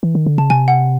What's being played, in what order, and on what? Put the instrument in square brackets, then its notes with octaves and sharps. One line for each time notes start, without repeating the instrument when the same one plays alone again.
[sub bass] E3
D#3
D3
[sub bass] C#3 [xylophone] A5
[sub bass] C3 [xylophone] G#5
[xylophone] F#5